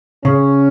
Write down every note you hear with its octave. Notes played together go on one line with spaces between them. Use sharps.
C#3 C#4